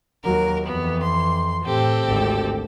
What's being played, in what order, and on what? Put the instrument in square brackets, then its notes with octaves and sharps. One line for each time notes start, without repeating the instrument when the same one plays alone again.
[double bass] D#2 F#3 [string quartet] A#4
[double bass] F2 E3 [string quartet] B3
[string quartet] C6
[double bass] A2 [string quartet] C4 G4 A4
[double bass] G#1 D2